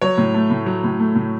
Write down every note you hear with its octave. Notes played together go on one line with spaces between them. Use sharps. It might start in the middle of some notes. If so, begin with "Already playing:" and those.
F#3 C#5
A2
A3
A2
F#3
A2
A3
A2